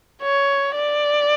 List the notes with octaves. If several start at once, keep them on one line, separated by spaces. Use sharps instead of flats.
C#5
D5